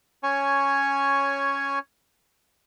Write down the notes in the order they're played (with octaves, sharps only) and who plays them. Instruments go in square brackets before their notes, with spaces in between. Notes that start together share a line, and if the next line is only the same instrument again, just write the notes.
[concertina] C#4 C#5 G#5